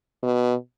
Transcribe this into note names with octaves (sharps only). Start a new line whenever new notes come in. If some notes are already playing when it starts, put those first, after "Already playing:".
B2